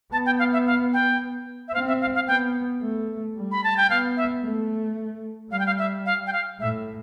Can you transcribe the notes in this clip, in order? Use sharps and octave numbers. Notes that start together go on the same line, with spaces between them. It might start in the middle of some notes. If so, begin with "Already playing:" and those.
B3 A5
G5
F5
E5
F5
G5
E5
C4 F5
E5
F5
F5
B3 G5
A3
G3
B5
A5
G5
B3 F5
E5
A3
G3 F5
G5
F5
E5
F5
G5
F5
A2 E5